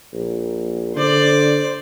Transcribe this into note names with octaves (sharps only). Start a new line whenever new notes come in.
A#1
D3 C5 D5